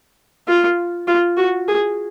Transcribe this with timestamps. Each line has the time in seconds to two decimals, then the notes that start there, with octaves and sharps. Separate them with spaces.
0.48 F4
1.08 F4
1.37 F#4
1.68 G#4